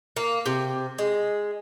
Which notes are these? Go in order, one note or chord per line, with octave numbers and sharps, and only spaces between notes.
A#3
C3
G#3